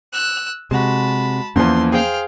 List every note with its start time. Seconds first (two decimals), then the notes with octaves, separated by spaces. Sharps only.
0.13 E6 F#6
0.71 C3 G#3 F#4 A5 B5
1.56 E2 E3 F3 A#3 C#4 C6
1.92 G#4 C5 F5 G5 F6